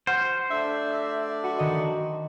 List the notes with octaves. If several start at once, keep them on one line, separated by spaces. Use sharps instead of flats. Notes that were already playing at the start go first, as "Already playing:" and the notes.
F#4 C5 F#5 F6
A3 D4 D5 E5
E6 A#6
F#4 B4
D#3 D#5